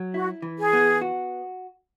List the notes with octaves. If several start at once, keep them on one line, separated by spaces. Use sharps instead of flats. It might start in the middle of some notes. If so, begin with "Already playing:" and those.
Already playing: F#3
E4 F#4
E3
G#4
B3
F#4